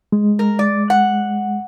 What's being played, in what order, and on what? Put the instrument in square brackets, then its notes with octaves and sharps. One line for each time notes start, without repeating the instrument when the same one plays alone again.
[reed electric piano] G#3
[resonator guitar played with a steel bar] A#4
D5
F#5